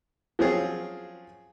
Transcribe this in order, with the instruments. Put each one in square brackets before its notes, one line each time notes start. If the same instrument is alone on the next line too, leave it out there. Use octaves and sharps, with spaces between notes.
[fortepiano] F3 F#3 C4 C#4 F4 G#4